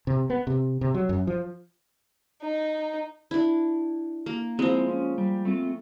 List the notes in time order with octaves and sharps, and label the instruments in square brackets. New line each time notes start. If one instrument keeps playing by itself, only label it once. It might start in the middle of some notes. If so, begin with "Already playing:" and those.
[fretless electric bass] C3
B3
C3
C3
F#3
F#2
F3
[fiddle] D#4
[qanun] D4 E4
A#3
[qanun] F3 G#3 [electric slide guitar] C4 E4 F4
[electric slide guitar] C#4
G3
A3 C4 F4